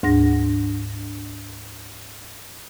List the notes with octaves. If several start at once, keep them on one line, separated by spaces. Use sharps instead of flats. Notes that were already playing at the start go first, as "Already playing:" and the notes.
D2 G#2 D4 A#6